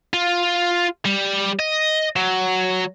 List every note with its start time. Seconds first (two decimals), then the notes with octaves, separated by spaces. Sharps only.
0.14 F4
1.05 G3
1.59 D#5
2.16 F#3